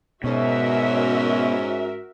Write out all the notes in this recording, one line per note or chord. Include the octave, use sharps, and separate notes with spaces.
G#2 B2 C#4 F#4 A#4 E5